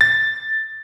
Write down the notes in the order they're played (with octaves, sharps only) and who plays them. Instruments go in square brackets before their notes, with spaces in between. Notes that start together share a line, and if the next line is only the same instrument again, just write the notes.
[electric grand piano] A6